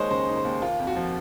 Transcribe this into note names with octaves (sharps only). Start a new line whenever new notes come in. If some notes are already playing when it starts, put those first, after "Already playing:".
Already playing: D#2 G#3 D#4 C5 C#5 D#5
C#3 C5
D#4
C5
D#2
A#3 F4
F2
F#4
F3